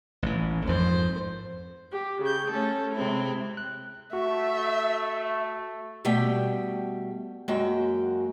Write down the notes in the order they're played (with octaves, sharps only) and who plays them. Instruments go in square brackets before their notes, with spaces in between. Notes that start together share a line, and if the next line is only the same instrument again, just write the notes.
[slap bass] A1 E3
[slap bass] F2 G#2 F3 [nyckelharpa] C5
[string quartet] G4
C#3 G6
A3 C#4 A4
C3 G#3 C4 E4
[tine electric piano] F#6
[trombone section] A3 [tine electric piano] F#4 [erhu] E5
[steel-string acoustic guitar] B2 G3 A3 G4 G5
F#2 G#3 A#3 F#4 G5